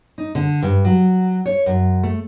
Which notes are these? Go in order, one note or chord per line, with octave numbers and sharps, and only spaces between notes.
D#4
D3
G2
F#3
C#5
F#2
A3